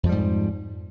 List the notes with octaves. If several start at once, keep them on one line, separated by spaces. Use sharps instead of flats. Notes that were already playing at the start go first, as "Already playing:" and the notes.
F2 G#2 F3 G3